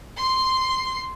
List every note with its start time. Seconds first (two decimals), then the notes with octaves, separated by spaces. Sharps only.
0.17 C6 C7